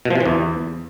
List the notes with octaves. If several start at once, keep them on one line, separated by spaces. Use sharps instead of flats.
B2
F3
C3
E3
E2